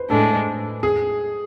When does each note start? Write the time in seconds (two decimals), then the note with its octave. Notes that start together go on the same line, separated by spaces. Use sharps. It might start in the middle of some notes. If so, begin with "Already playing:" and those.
Already playing: B4 C5
0.10 A2 G#3 D4 A4
0.83 G#4